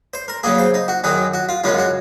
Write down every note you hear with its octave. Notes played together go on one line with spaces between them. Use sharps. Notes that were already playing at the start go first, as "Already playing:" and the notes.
C5
A#4
C#3 F#3 A#3 G#4
C5
D#4
F#4
F#2 D#3 F#3 G#4
F#4
F4
F#2 C#3 G#3 C#4 F4
F#4